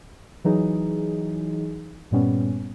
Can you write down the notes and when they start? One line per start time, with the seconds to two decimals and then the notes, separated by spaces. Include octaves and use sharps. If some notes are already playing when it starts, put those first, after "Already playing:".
0.44 E3 F#3 D#4 G#4
2.11 G2 A#2 G3 B3 C#4